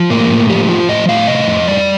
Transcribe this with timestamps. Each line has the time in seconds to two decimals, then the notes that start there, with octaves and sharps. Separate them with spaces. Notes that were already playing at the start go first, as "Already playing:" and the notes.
Already playing: F3
0.10 A2 A#3
0.30 A2
0.49 F3 G4
0.69 F3 F4
0.89 A2 D#5
1.09 A2 F5
1.28 C3 D#5
1.48 F2
1.67 G3 D5